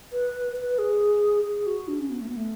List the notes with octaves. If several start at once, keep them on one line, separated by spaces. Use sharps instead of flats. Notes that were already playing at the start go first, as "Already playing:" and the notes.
B4
B4
G#4
G#4
F#4
D4
C#4
B3
A3
B3
A3